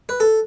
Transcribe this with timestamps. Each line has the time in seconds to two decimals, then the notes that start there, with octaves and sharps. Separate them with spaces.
0.09 B4
0.20 A4